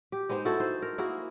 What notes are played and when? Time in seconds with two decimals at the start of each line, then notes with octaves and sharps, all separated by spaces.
0.12 G4
0.29 G#3 B3 D#4 C5
0.45 E4 F#4 G#4 A4
0.60 D#4 C5
0.82 A#4
0.98 A#3 E4 F#4 G#4